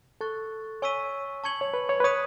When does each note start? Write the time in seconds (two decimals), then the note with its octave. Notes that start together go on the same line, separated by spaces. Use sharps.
0.21 A4 C#6 F#6 A6
0.82 C#5 G#5 C#6 E6 B6 D#7
1.44 A5 C#6 G#6 C#7 F#7
1.61 C#5
1.74 B4
1.89 C#5
2.00 B4
2.04 C#5 D#6 F#6 B6 D#7